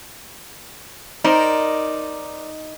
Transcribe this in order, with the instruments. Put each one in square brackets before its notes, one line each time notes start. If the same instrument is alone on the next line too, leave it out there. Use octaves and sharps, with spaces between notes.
[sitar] D#4 [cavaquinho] A#4 C5 D5